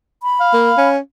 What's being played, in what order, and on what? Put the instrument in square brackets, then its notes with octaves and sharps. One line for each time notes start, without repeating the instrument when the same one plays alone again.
[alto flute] B5
[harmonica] F5
[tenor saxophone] A#3
C#4